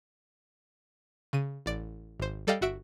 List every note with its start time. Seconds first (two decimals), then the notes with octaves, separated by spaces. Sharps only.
1.33 C#3 D#7
1.66 A1 D5 D7
2.20 G#1 C5
2.47 G3 A4 D5 D#5 F5 G5
2.61 G1 F#4 E5 D7